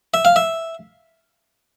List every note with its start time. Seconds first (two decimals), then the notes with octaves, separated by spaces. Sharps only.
0.14 E5
0.25 F5
0.36 E5